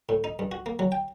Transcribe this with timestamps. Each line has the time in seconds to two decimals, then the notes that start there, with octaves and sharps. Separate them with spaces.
0.09 A2
0.24 D#4
0.39 G2
0.52 F#4
0.66 A#3
0.79 F#3
0.92 G5